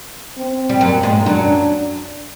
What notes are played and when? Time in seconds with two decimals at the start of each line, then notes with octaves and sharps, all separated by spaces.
0.37 C4
0.70 G3
0.81 F#2 F#3 A#3
1.03 G#2 G#3
1.26 F#2 F#3 D4